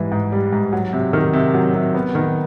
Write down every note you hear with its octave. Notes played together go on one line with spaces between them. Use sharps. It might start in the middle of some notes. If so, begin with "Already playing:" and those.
Already playing: G#2 E3 G3
G#2
G3
G#2
F#3
C3
D#3
C3
F#3
C3
B3
D#3